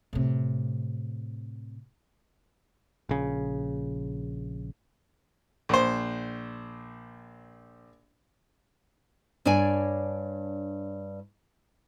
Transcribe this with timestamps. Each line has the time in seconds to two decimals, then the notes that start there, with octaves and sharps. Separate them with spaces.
0.13 A2 C3
3.09 A#1 C#3
5.69 A#1 C5
9.45 G2 D4 C#5 D5 G#5